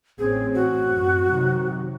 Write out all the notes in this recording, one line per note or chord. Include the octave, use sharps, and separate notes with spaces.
A1 C4 C#4 G#4
F#4
F#2
C3 D#3 F#3